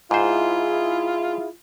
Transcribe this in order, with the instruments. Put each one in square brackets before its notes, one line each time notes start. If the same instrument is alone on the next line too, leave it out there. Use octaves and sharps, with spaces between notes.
[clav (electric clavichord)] G#2 C5 [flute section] E4 G#4 E5 [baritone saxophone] F4